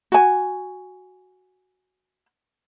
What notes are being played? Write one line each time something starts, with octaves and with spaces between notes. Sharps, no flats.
F#4 G#5